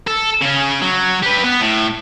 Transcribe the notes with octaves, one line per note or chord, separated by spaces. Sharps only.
A4
C#3 C#4
F#3
G4 B4
B3
A2